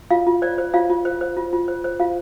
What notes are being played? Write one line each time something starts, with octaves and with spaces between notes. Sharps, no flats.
F4 F5
F4
C5 D5
C5
F4 F5
F4
C5
C5
F4
F4
C5
C5
F4 F5